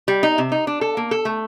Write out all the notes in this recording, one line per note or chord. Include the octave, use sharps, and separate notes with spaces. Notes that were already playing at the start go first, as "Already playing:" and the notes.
G3
D#4
C3
D#4
D4
A4
A#3
A4
A3